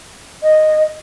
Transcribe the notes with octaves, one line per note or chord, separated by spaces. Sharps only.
D#5